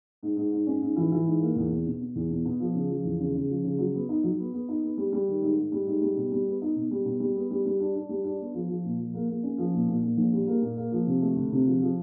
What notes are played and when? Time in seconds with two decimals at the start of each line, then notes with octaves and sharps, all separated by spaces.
0.23 G#2
0.37 G#2
0.52 G#2
0.67 C#4
0.82 G#2
0.96 E3
1.12 E3
1.26 G#2
1.41 A#3
1.56 E2
1.70 B2
1.86 B2
2.01 B2
2.16 E2
2.30 B2
2.45 B2
2.60 F3
2.75 C#3
2.90 F3
3.05 E2
3.20 C#3
3.35 C#3
3.49 F3
3.64 C#3
3.79 F#3
3.94 B3
4.09 D#4
4.23 F#3
4.39 B3
4.53 B3
4.68 D#4
4.83 B3
4.98 G3
5.12 G3
5.28 D#3
5.42 G#2
5.57 G#2
5.72 G3
5.87 G#2
6.02 G3
6.16 B2
6.32 G3
6.46 B3
6.62 D#4
6.76 B2
6.91 G3
7.05 B2
7.20 G3
7.36 B3
7.51 G3
7.66 G3
7.80 D4
7.95 D4
8.09 G3
8.24 D4
8.39 B3
8.54 F3
8.69 F3
8.84 A#2
8.98 F3
9.14 A#3
9.29 A#3
9.43 C#4
9.58 F3
9.73 A#2
9.88 A#2
10.03 A#2
10.18 A#1
10.33 G3
10.47 A#3
10.62 A#2
10.77 A#3
10.92 F3
11.07 C3
11.22 A3
11.36 D2
11.52 C3
11.66 F3
11.81 F3